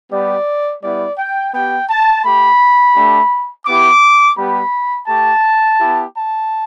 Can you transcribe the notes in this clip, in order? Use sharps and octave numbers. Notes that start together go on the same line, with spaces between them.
G3 B3 G4 D5
G3 B3 E4 D5
G5
B3 G4 G5
A5
A3 G4 B5
A3 D4 G4
B3 E4 G4 D6
G3 B3 G4 B5
A3 G4 A5
B3 E4 G4
A5